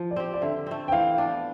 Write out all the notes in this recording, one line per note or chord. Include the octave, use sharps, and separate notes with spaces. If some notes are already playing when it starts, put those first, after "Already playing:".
Already playing: F3 F4
D5
C4 G4
D5
D3 E5
A3 C4
G5
E3 F5
B3 D4